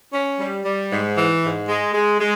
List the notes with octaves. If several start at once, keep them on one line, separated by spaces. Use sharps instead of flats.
C#4
G3
G3
G#2
E3
G#2
G#3
G#3
G#3